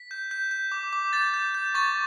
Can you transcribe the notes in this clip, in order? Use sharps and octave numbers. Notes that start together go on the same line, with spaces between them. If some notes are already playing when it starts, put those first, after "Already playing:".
Already playing: B6
G6
G6
G6
D6
D6
G6 A6
G6
G6
C#6 A6